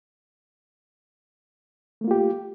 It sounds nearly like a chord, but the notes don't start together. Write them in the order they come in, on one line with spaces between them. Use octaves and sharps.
A3 A#3 F4 G4